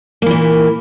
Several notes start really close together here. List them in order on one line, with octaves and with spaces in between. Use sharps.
A#3 E3 A#2